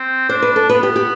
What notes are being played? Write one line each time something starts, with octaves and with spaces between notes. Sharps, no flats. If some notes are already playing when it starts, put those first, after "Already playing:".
Already playing: C4
D4 C5
B4
A4
B3 B4
G4
G4